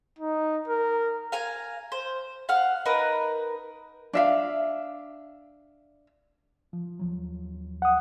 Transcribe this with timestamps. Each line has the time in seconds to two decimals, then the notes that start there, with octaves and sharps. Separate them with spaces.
0.19 D#4
0.67 A#4
1.32 F5 G#5 A#5
1.92 C5
2.49 F5 F#5 F6
2.86 D#4 A#4 B4
4.13 D4 E5 F5
6.73 F3
6.99 D#2 F3 F#3
7.82 F#5 D#6